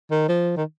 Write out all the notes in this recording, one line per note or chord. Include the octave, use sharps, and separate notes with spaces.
D#3
F3
D#3